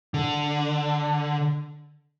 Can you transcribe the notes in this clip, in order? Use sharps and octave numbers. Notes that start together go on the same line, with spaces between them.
D3